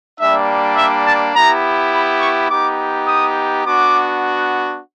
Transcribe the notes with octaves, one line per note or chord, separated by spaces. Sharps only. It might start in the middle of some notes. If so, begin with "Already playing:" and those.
G3 A#3 D4 E5
E5
A5
B3 E4 G4 A#5
B5
C#6
B3 D#4 G4 D6
D#6
B3 D4 F#4 D6